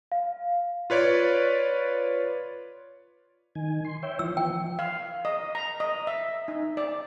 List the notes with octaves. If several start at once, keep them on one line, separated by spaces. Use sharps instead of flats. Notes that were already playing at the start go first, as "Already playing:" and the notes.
F5
F4 B4 C#5 D5
D#3 G#5
C6
C#5 E5 G5
E3 F3 E6
G5
F5
D#5
A#5
D#5
E5
D#4
D5